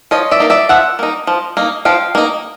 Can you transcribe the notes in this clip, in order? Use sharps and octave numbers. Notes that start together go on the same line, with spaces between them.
F3 C#5 D#5
D5 E5
A#3 D#4
D5 E5
F3 E5 F#5
A#3 D#4
F3
A#3 D#4
F3 F5 G5
A#3 D#4